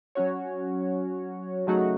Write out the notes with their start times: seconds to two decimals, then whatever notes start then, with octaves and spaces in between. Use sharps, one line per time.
0.15 F#3 C#4 F#4 C#5
1.67 C#3 F#3 A3 D#4 F#4